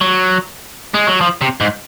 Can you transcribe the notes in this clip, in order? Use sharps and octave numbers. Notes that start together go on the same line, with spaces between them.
F#3
G#3
F#3
F3
C3
G#2